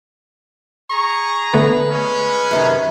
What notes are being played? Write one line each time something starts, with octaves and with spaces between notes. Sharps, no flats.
G#4 A#5 C#6
D3 A3 B3 B4
G#3 C#4
F#2 C3 D#3